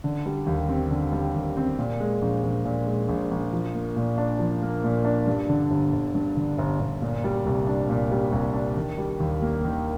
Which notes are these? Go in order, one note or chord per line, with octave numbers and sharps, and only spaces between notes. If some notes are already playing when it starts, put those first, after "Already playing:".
D3
G3
D#2
C4
D3
G3
D#2
C4
A#2
G#3
A#1
A#1
A#2
G#3
A#1
A#1
F3
A#3
A#2
D4
F3
A#3
A#2
D4
G2
D3
G1
G1
G2
D3
G1
G1
A#2
G3
C2
D4
A#2
G3
C2
D4
D#3
G3
D#2
A#3
D#3